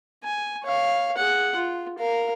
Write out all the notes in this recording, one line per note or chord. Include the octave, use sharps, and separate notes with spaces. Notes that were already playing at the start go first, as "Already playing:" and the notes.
G#5
C#5 F5
G#4 F#5
F4
A#4 F5